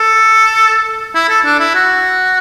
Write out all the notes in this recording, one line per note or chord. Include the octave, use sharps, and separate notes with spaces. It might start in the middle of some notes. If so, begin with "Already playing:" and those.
Already playing: A4
E4
A4
D4
E4
F#4